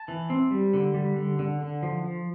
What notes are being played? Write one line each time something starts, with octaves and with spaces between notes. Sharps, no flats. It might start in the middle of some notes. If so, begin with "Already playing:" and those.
Already playing: A5
E3
C4
G3
D3
G3
D3
D3
D3
F3
F3